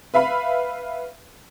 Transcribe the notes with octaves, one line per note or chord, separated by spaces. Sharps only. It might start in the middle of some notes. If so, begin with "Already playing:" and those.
B4 E5 F5 B5